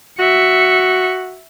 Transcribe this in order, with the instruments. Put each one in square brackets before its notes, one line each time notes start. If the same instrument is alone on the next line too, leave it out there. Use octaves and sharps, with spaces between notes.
[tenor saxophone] F#4 [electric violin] E5 C#7